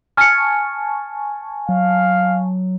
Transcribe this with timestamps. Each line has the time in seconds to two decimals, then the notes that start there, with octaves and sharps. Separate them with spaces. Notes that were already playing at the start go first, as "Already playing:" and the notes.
0.17 G#5 A5 C#6 F6 C#7
1.69 F#3 F5